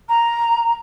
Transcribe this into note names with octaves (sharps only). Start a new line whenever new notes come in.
A#5